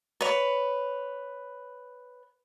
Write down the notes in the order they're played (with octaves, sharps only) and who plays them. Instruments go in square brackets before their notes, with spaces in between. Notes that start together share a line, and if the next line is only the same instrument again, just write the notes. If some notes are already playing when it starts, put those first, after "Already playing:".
[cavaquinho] B4 C#5